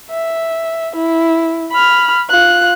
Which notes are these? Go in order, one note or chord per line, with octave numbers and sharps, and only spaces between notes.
E5
E4
B5 F6
F4 F#6